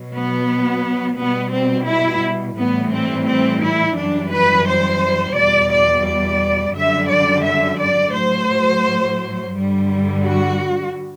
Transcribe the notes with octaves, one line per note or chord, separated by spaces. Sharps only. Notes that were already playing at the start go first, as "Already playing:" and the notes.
Already playing: B2 F#3
B3
B2 G3 B3
C4
E4
A2 E3 G3 B3
C4
C4
E4
F#2 E3 G3 D4
B4
C5
E2 B2 G3 D5
D5
D5
F#2 D3 G3 E5
D5
E5
D5
A2 F#3 C5
G2 D3 G3
F#4